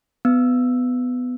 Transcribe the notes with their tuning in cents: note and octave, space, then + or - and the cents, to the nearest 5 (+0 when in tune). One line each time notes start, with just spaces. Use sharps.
B3 +15 E6 +0